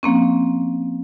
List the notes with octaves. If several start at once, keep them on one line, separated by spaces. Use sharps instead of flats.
F3 A#3 C4 C#4